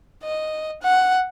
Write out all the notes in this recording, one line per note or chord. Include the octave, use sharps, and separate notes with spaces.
D#5
F#5